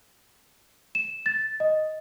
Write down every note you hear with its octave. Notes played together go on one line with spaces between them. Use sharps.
E7
A6
D#5